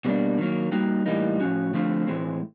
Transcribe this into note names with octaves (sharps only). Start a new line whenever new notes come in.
B2 G3 A#3 D4
D#3 F#3 A#3
G3 A#3 D#4 F#4
A2 E3 G3 A#3 D#4
A2 F3 G#3 C#4 F#4
D3 F3 A3 C4 F4
A2 E3 G#3 C4